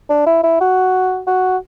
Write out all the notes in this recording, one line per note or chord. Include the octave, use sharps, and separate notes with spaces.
D4
E4
E4
F#4
F#4